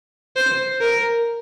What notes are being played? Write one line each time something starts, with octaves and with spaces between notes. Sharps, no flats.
C5
A#4